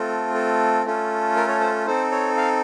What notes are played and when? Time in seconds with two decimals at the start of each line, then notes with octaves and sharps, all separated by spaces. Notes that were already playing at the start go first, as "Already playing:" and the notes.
Already playing: A3 C4 F4 A4
0.34 A4
0.85 A3 C#4 F4 A4
1.36 A#4
1.48 C#5
1.61 C5
1.86 C4 D#4 A4 C5
2.12 C#5
2.37 F5